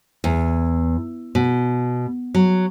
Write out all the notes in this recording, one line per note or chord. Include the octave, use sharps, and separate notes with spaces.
E2
B2
F#3